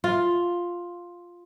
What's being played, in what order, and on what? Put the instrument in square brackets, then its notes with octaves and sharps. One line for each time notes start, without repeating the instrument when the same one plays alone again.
[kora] F4